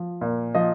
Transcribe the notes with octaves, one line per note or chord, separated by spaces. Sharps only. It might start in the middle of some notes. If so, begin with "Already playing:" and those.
Already playing: F3
A#2
F3 D#5